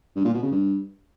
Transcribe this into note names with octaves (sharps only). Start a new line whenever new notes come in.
G2
A#2
B2
C#3
G2